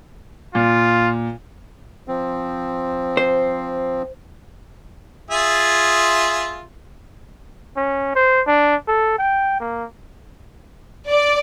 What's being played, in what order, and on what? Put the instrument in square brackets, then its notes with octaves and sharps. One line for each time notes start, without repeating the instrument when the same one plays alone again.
[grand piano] A#2 [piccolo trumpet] F4
[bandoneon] F3 C4
[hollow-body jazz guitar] C5
[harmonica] F4 G#4 E5
[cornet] C#4
C5
D4
A4
G5
A#3
[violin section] D5